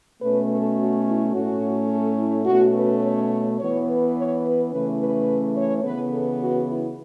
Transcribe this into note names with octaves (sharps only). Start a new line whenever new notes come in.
B2 A3 C#4 B4
A4
F#4
E4
A2 A3 C#4 F#4
A4
E4
B2 A3 C#4 F#4
B4
C#5
E3 B3 C#5
B4
C#5
B4
C#3 E3 A3 C#4 B4
B4
C#5
C#3 E3 B3 B4
A4
F#4
E4